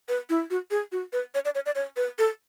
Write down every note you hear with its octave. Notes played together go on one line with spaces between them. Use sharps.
B4
E4
F#4
G#4
F#4
B4
C#5
D5
C#5
D5
C#5
B4
A4